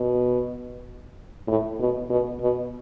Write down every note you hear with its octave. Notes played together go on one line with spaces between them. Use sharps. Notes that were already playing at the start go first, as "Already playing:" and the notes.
Already playing: B2
A2
B2
B2
B2